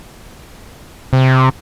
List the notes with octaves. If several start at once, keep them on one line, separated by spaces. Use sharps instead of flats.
C3